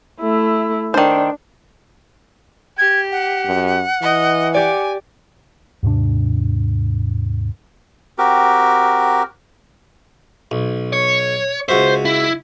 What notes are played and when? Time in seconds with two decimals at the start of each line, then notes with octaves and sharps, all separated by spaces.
0.20 A3 E4
0.94 D#3 D4 C5
2.78 G4 G#6
3.11 F#5
3.46 F#2
4.02 E3 D#5
4.54 G4 D5 G#5
5.83 D#2 G#2 C3 D4
8.18 C4 F#4 G4 A#4
10.51 B1
10.93 C#5
11.69 C#2 F#4 C5 E5
12.05 E4